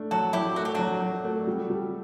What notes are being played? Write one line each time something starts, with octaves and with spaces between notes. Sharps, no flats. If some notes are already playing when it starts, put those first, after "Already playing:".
Already playing: A3 D4
F#3 F#4 A4
F#3 E4 G4
A3 F#4
G4
F#3 D4 F#4
F#3
A3
G3
G3